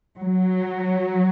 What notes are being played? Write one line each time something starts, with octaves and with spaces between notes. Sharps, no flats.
F#3